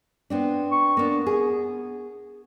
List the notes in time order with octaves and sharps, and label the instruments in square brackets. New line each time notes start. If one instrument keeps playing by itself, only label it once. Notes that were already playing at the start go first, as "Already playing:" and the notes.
[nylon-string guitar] B3 C4 D4
[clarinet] C#6
[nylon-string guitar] A#3 D4 [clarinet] B3
[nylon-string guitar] G#4